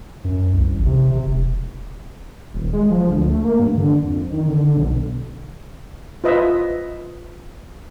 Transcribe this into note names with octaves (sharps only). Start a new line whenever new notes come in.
F#2
C2
A1
C3
C3
E1
D#1
G#3
F3
D2
A3
A#3
G2
D3
F2
D#3
D3
B1
F4 B4 D#5 E5